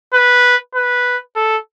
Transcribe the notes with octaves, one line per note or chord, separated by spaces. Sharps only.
B4
B4
A4